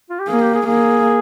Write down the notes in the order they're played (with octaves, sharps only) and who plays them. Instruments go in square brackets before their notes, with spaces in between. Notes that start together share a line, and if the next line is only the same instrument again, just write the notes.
[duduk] F4
G4
[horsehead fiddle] A#3 [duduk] G#4
[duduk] G4
G#4
[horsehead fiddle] A#3 [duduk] G#4